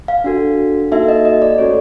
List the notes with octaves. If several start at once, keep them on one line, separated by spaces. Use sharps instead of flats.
F5
D4 F#4 A4
A#3 D#4 F#4 A4 E5
D#5
D#5
D5
A3 C#4 F#4 A4 C#5